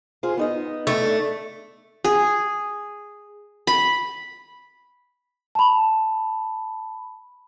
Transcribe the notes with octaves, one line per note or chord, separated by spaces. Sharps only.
F4 G#4 C5
B3 D#4 D#5
A3 D#4
D4
G#4
B5
A5 B5